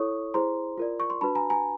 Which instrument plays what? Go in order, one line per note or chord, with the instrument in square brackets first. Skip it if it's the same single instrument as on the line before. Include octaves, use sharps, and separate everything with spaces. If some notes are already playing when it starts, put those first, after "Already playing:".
Already playing: [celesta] E4 A4 C#5 C#6 D#6
E4 G#4 C5 A#5 C6
F4 A#4 D5
C#6
C6
D4 F#4 B4 A5 B5
G#5 A#5
G#5 A#5